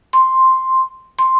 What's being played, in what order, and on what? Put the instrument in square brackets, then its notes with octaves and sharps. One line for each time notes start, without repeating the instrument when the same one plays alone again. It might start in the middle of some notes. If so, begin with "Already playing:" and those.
[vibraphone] C6
C6